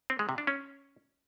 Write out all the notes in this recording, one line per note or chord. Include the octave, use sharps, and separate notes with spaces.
C4
G#3
C3
D4
C#4